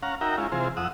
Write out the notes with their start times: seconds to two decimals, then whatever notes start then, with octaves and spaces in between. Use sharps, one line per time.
0.03 C#4 F5 F#5 A#5
0.21 D#4 F#4 A#4 E5 G5 A#5
0.38 G#3 C#4 E4 F4
0.52 C3 E3 F4 G#4 C5
0.77 F2 F#5 D#6 E6